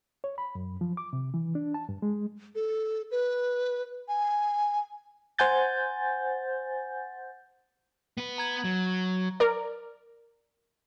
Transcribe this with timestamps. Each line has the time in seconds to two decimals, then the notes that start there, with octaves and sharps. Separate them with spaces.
0.24 C#5
0.38 B5
0.55 F#2
0.81 F3
0.97 D6
1.13 C3
1.34 E3
1.55 D4
1.74 A5
1.89 G2
2.02 G#3
2.55 A4
3.11 B4
4.08 G#5
5.39 C5 F#5 G#5 G6 A6
8.18 B3 B4
8.38 A#5 G#6 F#7
8.64 F#3
9.40 A#4 D5